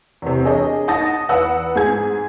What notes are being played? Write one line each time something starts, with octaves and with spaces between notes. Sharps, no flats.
E2 C3
D4 G#4 A#4 C#5 D#5
D#4 F#5 A5 D#6 A6 A#6
E2 B4 F#5 E6
G#2 G#4 G#5 G#6